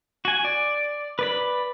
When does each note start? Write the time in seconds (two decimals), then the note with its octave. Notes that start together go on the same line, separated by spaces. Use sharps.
0.25 F#4 G#5
0.45 D5
1.19 B4 D5 B5